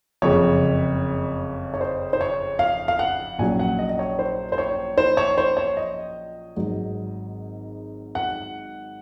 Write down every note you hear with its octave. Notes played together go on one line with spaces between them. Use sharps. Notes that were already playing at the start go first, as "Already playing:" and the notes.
F#1 F2 C#3 C#5
C#5
C5
C5
C#5
F5
F5
F#5
A#1 A#2 F#3 C#4 G#5
F#5
D#5
D#5
C#5
C5
C5
C#5
C5
C#5
C5
C#5
D#5
G#1 G#2 F#3
F#5